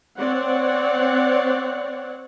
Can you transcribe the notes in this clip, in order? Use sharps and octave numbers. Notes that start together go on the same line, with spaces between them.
C4 C#5 D5 F#5